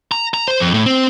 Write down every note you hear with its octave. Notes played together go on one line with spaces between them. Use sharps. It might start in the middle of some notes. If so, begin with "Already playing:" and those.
A#5
A#5
C5
F2
A2
C4